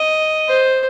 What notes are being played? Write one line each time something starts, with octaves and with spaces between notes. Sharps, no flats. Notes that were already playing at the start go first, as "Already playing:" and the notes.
Already playing: D#5
C5